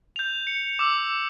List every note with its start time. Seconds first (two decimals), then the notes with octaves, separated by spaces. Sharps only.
0.16 G6 F7
0.47 C#7
0.79 D6 E6